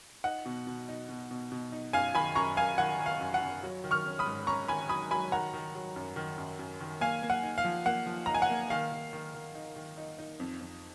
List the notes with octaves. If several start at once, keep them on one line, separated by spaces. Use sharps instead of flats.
D#4 F#5
B2
B2
D#4
B2
B2
B2
D#4
F#2 F5 G#5
D#3 G#5 B5
F#2 A#5 C#6
F#2 F5 G#5
D#3 F#5
D#3
F5
F#2
F#5
F#2
F#3
D#3
C#6 F6
C#4
B5 D#6
G#2
C#4 A#5 C#6
D#3 G#5 B5
F#3 B5 D#6
F#3 G#5 B5
D#3 F#5 A#5
D#3
F#3
F#2
D#3
F#2
F#2
D#3
A#3 F5 G#5
A#3
F#5
D#4
F5
F3
A#3 F#5
F3
D#4 A#5
G#5
F#5
A#3
D#3 F5
D#3
D#3
D#3
D#4
D#3
D#4
D#4
F2
F2